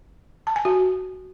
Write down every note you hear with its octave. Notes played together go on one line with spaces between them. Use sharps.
A5
G#5
F#4